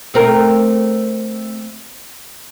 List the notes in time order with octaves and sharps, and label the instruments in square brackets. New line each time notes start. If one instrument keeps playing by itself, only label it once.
[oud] A3 C4 A#4